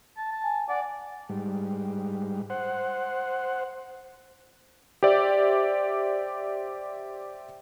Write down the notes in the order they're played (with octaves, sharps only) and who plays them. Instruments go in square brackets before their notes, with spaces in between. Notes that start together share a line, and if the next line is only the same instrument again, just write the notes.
[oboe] A5
A5
[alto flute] G#5
[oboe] D5 [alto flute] F#5
[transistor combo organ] G#2 G3
C5 F#5
[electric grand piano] G4 C5 D5 E5